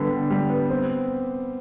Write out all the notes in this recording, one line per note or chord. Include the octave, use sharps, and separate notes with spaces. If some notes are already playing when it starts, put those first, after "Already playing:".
Already playing: D3 G3 B3
D3
G3
B3
C4